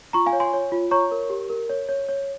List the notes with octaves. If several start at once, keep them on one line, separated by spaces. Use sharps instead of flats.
F4 A#5 C#6
F5 G#5
C#5
G#5 C6
C#5
F4
C#5 A#5 C#6
A#4
G4
A#4
C#5
C#5
C#5